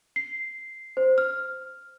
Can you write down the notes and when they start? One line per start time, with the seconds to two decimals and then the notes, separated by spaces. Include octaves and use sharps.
0.16 C7
0.97 C5
1.18 F6